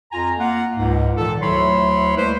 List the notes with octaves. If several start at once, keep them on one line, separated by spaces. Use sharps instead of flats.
F2 F4 G#5 A#5
A#3 F4 F#5
C#2 G#2
A#2 D#3 E3 A4
D2 F#3 E4 C#5 B5 C6
G3 A3 A#3 E4 B4 C5